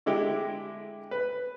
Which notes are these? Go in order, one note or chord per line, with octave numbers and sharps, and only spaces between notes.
D3 G#3 E4 G4
B4